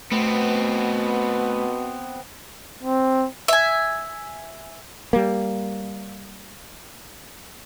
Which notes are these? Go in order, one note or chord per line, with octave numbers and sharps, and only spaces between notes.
B2 A3 B3 C4
C4
E5 G#5
G3 A#3